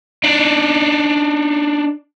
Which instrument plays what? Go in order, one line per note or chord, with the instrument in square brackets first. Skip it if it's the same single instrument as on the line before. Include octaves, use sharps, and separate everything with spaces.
[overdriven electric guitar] D4 D#4